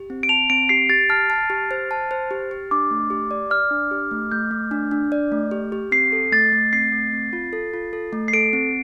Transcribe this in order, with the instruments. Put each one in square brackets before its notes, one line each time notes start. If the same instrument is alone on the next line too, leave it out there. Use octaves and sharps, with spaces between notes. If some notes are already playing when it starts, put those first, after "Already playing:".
Already playing: [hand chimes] G4
C4
[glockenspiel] D7
[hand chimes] A5 [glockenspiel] F7
[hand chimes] C4 [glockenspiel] D7
[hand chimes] G4 [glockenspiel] C7
[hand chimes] G4 [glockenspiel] A6
[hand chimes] A5 [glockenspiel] F6
[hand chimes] A5
G4
C5
A5
C5
G4
G4
[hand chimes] D4 [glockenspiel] D6
[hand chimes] A3
G4
D5
[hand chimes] D5 [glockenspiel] F6
[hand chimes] D4
G4
A3
[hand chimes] A3 [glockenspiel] G6
[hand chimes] A3
D4
D4
D5
A3
G4
G4
[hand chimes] C4 [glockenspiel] C7
[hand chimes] A4
[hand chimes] A3 [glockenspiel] A6
[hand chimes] A3
[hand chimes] C4 [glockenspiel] C7
[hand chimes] A3
C4
F4
A4
F4
A4
A3
[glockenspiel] C7
[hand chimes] A4 [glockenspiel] D7
[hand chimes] C4